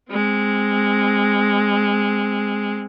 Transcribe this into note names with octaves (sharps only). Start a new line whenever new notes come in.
G#3 C4